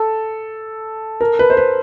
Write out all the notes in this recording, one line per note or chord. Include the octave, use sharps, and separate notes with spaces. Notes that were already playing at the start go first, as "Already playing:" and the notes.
Already playing: A4
A#4
B4
C5
B4